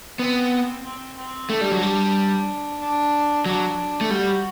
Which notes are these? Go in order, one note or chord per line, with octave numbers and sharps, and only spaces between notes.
B3 C4
C4
C4
A3 D4
G3
F#3
G3
D4
F#3 D4
A3
G3 F#4